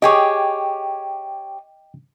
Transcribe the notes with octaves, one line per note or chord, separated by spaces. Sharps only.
G4 G#4 C#5 D#5 G5 D6